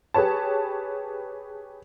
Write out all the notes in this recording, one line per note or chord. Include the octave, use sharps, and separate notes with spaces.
G4 G#4 B4 C#5 A5